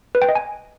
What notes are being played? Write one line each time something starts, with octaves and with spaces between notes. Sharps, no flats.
B4
G5
D#5
G#5